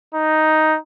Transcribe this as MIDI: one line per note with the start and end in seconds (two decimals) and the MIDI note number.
0.14 0.78 63